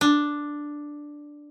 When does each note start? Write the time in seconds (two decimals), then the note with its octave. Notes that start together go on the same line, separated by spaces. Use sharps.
0.01 D4